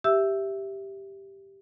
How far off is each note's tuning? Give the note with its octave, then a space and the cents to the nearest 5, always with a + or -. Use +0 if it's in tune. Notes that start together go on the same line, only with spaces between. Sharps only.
G4 +0 E5 +0 E6 +0